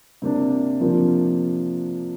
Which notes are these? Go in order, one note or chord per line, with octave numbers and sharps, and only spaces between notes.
C3 A#3 D4
C3 F3 A#3 D4